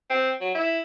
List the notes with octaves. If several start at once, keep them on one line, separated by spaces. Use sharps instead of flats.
C4
F#3
E4